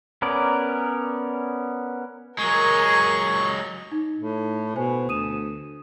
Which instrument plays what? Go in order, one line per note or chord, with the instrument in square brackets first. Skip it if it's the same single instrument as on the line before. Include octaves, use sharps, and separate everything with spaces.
[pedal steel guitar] B3 C#4 A#4 D5
[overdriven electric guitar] F#3 G#3 [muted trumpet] G#4 [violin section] A#4 A#5 [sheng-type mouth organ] C#6
[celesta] D#4
[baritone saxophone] A2
[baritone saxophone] B2 [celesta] C5 G#5
[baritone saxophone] D2 [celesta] D#6 D#7 E7